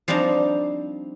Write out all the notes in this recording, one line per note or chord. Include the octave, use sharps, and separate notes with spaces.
F3 G3 C4 D4 D#4 A#5